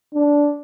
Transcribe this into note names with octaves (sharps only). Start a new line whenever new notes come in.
D4